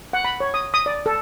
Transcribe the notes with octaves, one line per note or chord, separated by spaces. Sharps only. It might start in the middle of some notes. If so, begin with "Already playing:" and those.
F#5
B5
C#5
D#6
D#6
D5
A4